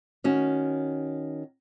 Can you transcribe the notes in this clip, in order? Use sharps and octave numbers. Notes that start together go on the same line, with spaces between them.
D#3 C#4 F#4